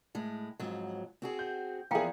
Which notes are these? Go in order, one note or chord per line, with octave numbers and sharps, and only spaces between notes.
A2 G#3
F2 G#2 F#3
C4 F#4 G#4
G6
E2 F3 A#3 E4 G#4 F5 G5 A#5